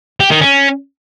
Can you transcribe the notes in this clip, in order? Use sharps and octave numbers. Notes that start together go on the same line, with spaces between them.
G4
D#3
C#4